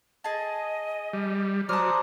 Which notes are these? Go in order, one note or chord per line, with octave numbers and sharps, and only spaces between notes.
G#4 D#5 A5
G3
F#3 C5 D5 A5 A#5 D#6 F6